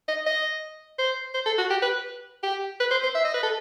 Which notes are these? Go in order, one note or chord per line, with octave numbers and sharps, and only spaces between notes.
D#5
D#5
C5
C5
A4
F#4
G4
B4
G4
B4
C5
C5
E5
D#5
B4
A4